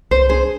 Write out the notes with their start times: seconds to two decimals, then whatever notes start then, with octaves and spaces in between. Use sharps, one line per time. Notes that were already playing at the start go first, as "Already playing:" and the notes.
0.11 C2 C5
0.29 D4 G#4 C5